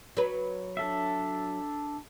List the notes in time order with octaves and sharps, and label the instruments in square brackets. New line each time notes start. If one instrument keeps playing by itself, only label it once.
[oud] F#3 B4
[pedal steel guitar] D4 A4 E5